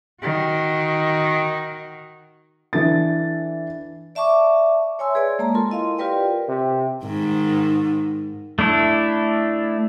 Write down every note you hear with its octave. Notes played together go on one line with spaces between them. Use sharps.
D#3 F#4
E3 D4 A4 A6
D5 E5 A5 C#6 D6
C#5 E5 G#5 C6 E6
G#4 B4 C#5 D5 G#5
G#3 A#3 A5 A#5
F4 A4 A#4 C6
E4 D#5 F5 C6
F4 G4 A#4 B4 D5 G5
C3
G#2 D#3
A3 D4 E4